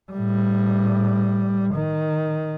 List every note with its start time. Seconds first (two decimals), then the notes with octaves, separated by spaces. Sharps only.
0.11 A2 G3
1.74 D#3